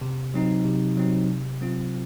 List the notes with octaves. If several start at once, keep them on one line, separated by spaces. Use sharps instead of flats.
C3
F#3 C4 D#4
C3
F#3 C4 D#4
C3
F#3 C4 F4